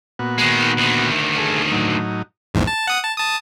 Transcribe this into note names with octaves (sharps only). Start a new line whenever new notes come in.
A#2 B3 F#4
D#3 G#3
D2 D#3
G#4 A4
A2 F#3 D#4
A#1 E2 G#2
A5
F#5 D#6
A5
A5 D#6